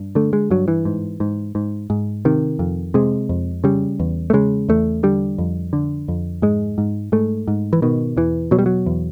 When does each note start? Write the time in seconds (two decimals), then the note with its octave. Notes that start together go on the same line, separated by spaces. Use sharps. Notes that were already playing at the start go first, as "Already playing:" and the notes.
Already playing: G2
0.15 D3 A3
0.33 G#3
0.51 G2 F#3
0.68 E3
0.85 G#2
1.20 G#2
1.55 G#2
1.90 G#2
2.25 C3 D#3
2.59 F2
2.94 C3 G#3
3.29 F2
3.64 C#3 G3
4.00 E2
4.30 A3
4.33 C#3 G#3
4.69 E2 A3
5.03 D3 G3
5.38 F2
5.73 D3
6.08 F2
6.42 G#2 G#3
6.78 G#2
7.12 G#2 A3
7.48 G#2
7.73 E3
7.82 B2 D#3
8.17 E2 E3
8.51 B2 F#3
8.59 G3
8.66 F#3
8.86 E2